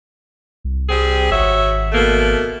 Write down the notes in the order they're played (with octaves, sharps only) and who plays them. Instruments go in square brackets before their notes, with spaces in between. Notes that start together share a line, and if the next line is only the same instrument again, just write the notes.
[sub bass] C2
[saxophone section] G3 C4 G#4
[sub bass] G#1 [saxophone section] F#4 C#5 E5
[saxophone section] B2 A3 A#3